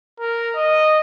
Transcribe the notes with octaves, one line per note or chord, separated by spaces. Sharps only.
A#4
D#5